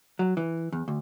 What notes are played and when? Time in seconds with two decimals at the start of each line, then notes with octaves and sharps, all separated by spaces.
0.19 F#3
0.37 E3
0.72 E2
0.88 D2